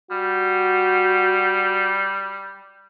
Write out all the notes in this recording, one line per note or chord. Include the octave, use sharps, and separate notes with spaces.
G3 F#4